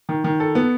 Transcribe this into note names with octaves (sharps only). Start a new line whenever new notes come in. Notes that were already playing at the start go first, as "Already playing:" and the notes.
D#3
D#3
A4
B3